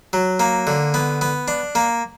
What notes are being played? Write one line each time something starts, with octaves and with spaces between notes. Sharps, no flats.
F#3
A#3
D3
B3
B3
D4
A#3